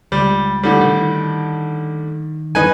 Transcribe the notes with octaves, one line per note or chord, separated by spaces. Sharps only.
C#2 G3
A2 D3 G3
D#3
E2 G2 E3 D#4 B4 G#5